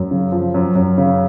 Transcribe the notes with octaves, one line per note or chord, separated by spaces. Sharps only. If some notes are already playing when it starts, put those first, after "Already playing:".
Already playing: F#2
C#3
F3
F#2
F#2
C#3